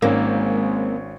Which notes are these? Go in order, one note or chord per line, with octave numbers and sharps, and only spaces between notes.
G#1 G#3 A#3 C4 C#4 A#4